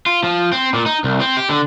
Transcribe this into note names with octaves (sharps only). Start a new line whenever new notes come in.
F4
F3
C4
A#2
D#4
C2
C4
G4
D3